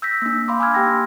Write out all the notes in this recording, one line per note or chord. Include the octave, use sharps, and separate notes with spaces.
E6 G6 A#6 B6
A#3 D4
F5 B5 C6 D6
G#5 B5 D6 E6 F6 G#6
A#3 D4 G4 G5 A#6